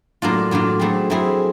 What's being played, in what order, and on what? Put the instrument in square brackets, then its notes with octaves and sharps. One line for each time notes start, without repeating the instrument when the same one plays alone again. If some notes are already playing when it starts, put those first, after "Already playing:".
[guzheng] A2 F#3 A#3 D4 F4
A2 F#3 A#3 D4 F4
F#3 A3 C4 E4 G#4
F#3 A3 C4 E4 G#4